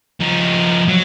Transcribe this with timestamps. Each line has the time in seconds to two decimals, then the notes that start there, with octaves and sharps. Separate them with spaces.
0.20 F3 D#4
0.88 F#3